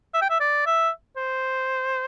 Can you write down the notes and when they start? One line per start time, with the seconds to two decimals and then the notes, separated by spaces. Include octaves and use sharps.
0.14 E5
0.22 G5
0.30 E5
0.40 D5
0.66 E5
1.17 C5